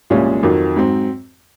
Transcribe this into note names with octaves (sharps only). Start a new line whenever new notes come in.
C2 A#2 F3 G#3 C#4
F2 D#3 F#3
G#2 F#3 C4